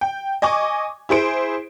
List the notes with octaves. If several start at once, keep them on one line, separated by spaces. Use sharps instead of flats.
G5
D#5 G#5 C#6 D6
E4 G#4 C5 D7